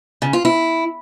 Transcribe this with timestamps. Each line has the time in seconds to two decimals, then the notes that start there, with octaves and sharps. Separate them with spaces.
0.22 C#3
0.33 F4
0.45 E4